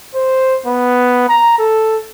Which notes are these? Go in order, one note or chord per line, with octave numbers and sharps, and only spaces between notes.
C5
B3
A#5
A4